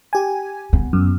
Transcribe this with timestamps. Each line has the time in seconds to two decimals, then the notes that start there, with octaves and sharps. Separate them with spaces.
0.13 G4 G#5
0.73 B3
0.93 F#2